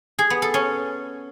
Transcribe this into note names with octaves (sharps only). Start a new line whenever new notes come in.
G#4
B3
A4
C#4